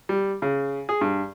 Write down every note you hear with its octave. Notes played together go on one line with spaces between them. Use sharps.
G3
C#3
G#4
G2